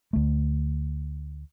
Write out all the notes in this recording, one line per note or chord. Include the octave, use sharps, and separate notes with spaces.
D2 A3